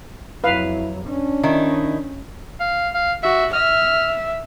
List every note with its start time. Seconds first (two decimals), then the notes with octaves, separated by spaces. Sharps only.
0.44 F2 F#3 E4 B4 F5
1.06 C#4 D4
1.43 D#3 D#4 E4
2.60 F5
2.94 F5
3.23 F#4 E5
3.53 E5 F6